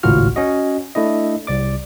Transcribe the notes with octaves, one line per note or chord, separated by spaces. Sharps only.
G#1 C#2 A2 F4 F#4 F6
C#4 F#4 D#5
A3 D4 E4 D#5
C2 D5 D6